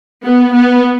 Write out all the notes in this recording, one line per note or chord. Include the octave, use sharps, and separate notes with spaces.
B3
B3